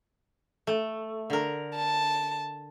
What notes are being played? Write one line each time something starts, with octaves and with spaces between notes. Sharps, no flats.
A3
D3 A#4
A5